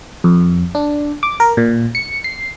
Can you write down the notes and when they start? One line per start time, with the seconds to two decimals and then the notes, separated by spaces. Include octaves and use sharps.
0.24 F2
0.75 D4
1.23 D6
1.40 A#4
1.57 A#2
1.95 C#7
2.24 C7